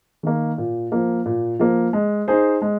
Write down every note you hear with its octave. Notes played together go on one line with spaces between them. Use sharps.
D#3 A#3
A#2
F3 A#3
A#2
F3 A#3
G#3
D#4 G#4 C5
G#3